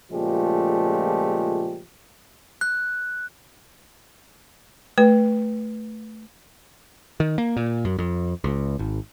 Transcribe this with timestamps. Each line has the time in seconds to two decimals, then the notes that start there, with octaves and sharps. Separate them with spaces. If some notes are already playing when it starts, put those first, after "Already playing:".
0.12 A#2 C#3 F3 G#3 A3 G4
2.61 F#6
4.98 A3 B4
7.20 D#3
7.38 A#3
7.57 A#2
7.85 F#2
7.98 F2
8.44 C#2
8.79 G#1